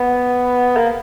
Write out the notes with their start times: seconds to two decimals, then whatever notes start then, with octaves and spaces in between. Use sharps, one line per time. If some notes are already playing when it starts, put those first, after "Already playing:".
Already playing: B3
0.77 A#3